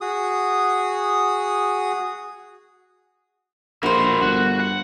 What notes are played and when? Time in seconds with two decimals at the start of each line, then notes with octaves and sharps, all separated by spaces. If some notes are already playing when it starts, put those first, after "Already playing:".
0.01 F#4 G#4 D#6
3.83 A#1 E4 F#4 A#4 C5
4.21 G1 F#4 F#6
4.60 F#5